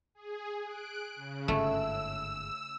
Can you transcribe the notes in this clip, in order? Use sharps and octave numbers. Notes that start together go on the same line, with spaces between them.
G#4
F#6 D7
C#3
G1 G#2 A3 C#4 E6